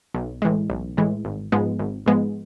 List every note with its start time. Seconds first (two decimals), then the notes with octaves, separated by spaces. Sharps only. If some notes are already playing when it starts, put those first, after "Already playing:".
0.15 B1
0.42 A2 E3 G#3
0.70 B1
0.97 A2 E3 G#3
1.25 G#1
1.52 G#2 F3 G#3 B3
1.79 G#1
2.06 G#2 F3 G#3 B3